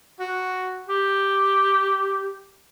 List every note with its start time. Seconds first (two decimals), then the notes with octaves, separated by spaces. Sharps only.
0.20 F#4
0.89 G4